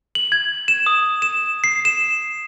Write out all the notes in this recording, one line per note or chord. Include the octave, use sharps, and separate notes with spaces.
F#7
G#6
E7
D#6
E7
C7
E7